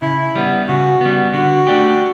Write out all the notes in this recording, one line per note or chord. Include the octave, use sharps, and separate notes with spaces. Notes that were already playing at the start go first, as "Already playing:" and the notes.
C#3 E4
G3 B3
C#3 F#4
G3 B3
D3 F#4
A3 D4 G4